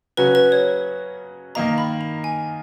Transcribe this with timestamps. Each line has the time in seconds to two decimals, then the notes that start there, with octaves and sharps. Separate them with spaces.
0.17 C#3 F#3 C#4 F#4 B4
0.35 B4
0.52 C#5
1.55 D#3 A#3 D#4 A#5
1.78 B5
2.01 A#5
2.24 G#5